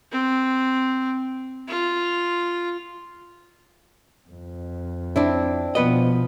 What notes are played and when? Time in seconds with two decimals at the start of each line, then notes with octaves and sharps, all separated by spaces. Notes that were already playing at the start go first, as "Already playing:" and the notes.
0.12 C4
1.68 F4
4.29 F2
5.16 C4 D4 E4
5.75 B2 F3 B3 B4 D#5